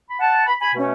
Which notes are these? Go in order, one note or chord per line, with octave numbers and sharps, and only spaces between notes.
B5
F#5 A5
B5
G#5 B5
B2 A3 C#4